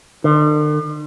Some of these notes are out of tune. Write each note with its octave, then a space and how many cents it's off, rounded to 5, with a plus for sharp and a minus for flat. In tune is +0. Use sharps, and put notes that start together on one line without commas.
D3 +45